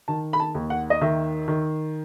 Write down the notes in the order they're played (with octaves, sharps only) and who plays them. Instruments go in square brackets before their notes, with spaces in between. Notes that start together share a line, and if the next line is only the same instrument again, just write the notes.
[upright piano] D#3 A5
B5
A5
D#2
F#5
D#5
D#3 E5
D#3